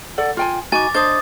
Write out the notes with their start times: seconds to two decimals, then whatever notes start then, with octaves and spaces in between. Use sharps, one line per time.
0.18 A4 D5 F#5
0.37 F4 G5 G#5
0.72 D#4 F#4 G#5 D6 A6
0.94 D4 C5 D#5 D#6 A6